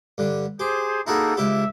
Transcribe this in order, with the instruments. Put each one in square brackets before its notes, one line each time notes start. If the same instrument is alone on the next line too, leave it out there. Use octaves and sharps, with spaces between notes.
[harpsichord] G2 D3
[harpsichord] G4 [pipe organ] G#4 C5
[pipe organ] A#3 D#4 A4 [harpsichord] E4 F#4 G#4
[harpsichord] C#2 E4 G4 [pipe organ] E5